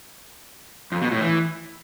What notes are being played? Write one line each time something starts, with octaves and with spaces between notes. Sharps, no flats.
F2
B2
A2
E3